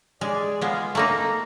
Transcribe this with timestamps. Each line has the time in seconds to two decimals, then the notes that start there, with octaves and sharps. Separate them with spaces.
0.21 G#3 G#4 D5
0.61 G#3 B3 F4 G#4 F5
0.95 A3 A#3 D#4 A#5